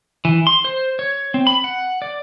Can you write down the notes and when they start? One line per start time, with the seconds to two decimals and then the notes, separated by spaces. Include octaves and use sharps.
0.25 E3
0.47 C6
0.65 C5
0.99 C#5
1.34 C4
1.47 B5
1.64 F#5
2.02 D5